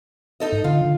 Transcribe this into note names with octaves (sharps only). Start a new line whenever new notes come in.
D#4 A4 D#5
G#2
D3 F4
D3